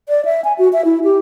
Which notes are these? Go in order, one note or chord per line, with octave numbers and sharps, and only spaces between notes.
D5
E5
G#5
F#4
E5
E4
G4